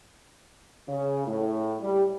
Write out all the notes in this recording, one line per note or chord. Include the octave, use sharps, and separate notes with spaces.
C#3
A2
G3